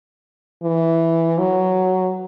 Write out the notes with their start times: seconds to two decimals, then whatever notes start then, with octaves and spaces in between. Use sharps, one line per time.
0.64 E3
1.38 F#3